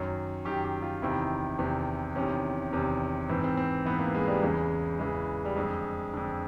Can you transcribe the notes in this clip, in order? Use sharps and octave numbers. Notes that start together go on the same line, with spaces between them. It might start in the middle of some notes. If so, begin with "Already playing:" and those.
Already playing: F#2 D#3 C#5
F#2 D#3 G4
G4
F4
E2 C3 D#3 E4
E2 C3 D#3
E2 C3 D#3 C#4
E2 C3 D#3
G#2 E3 C4
C4
C4
G#2 E3 B3
A#3
G#3
G3
E2 C#3 E3 G#3
E2 C#3 E3 G#3
G3
F2 D3 G#3
F2 D3